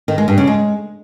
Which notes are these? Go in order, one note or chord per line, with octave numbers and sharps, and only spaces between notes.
D#3
G#3
G2
C#3
G#3